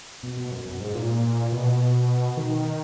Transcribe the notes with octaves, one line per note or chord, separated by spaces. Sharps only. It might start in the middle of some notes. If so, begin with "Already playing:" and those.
B2
B2
F#2
F#2
G#2
A#2
B2
D#3